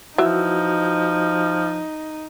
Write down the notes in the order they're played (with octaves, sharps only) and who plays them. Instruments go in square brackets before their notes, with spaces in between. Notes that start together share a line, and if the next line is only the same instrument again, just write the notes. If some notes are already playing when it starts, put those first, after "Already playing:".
[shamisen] E3 [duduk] F3 [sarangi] D#4 [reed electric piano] F#4 E6